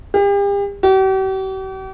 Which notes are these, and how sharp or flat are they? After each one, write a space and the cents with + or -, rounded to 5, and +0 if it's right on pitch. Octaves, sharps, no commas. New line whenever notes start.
G4 +40
G4 -45